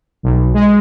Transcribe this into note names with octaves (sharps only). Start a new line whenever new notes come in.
B1
G#3